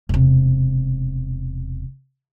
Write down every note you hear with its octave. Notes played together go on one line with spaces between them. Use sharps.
E1 C3